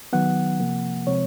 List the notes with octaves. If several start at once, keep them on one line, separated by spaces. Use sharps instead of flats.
D#3 F#3 B3 F#5
C3 F3 A#3
C3 F3 G#3 C4 C#5